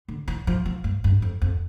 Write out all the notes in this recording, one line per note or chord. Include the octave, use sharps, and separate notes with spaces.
D3
E3
F3
F3
G2
G2
F2
F2